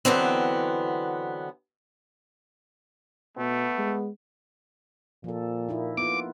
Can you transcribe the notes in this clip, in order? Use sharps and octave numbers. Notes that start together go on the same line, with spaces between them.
D3 E3 F#3 B3 C4
B2 A3 B3
G#3
A#2 F3 A4
A#3 D#4 E4
B3 F4 D6